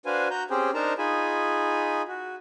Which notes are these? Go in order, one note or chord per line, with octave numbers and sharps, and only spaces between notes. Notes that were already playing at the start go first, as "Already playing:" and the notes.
D4 F#4 B4 C5 F5 G#5
F#4 A#5 G6
C4 C#4 G4 G#4 C5 G5
D4 D#4 A#4 C5 A5 A#5
D#4 F4 G#4 G#5 B5
F#4